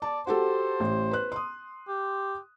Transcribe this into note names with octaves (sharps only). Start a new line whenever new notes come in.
D5 A5
F#4 G4 A4 C5
A1
B4 F#6
C6 D#6
G4